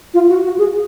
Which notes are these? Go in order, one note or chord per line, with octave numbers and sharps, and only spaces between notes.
F4
F#4
F#4
G#4